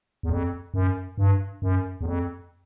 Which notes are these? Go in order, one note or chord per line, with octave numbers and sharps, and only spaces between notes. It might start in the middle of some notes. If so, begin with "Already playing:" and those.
E2
F2
F#2
G2
F#2
E2
F2